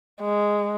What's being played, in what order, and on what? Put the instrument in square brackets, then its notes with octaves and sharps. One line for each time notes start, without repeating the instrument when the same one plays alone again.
[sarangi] G#3